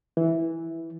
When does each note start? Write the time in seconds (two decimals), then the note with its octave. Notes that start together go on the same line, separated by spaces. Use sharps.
0.17 E3